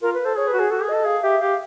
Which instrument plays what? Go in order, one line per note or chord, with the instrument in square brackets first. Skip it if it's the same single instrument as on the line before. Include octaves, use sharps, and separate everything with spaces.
[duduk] F4 [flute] A#4
[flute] B4
[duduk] A4 [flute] C5
[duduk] G#4 [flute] C#5
[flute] B4
[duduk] F#4
[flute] G#4
[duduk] F#4 [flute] A4
[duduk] G#4
[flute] D#5
[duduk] A4
[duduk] G#4 [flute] F5
[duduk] G4 [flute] E5
[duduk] G4 [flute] F5